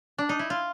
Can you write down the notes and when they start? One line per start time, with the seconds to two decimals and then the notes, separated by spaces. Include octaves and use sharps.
0.18 D4
0.29 D#4
0.39 E4
0.50 F4